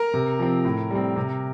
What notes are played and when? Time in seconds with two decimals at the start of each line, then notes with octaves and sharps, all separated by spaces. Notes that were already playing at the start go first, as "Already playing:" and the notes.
Already playing: A#4 A#5
0.14 C3
0.39 F3 C4
0.65 A2
0.91 G3 C4
1.16 C3